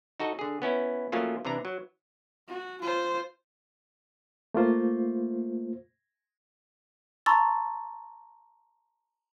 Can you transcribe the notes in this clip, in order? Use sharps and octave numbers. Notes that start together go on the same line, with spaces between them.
D#4 F#4 A4 D#5
D3 G#4
B3 C#4 E4
F3 F#3 A3 A#3 C#4 F4
C3 E3 D4 A#5
F#3
F#4
F4 C5
A3 A#3 F4 C5
A5 A#5 C6 C#6 E6 A6